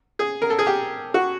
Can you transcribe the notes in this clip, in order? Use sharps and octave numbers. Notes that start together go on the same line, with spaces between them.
G#4
A#4
A4
G#4
G4
F#4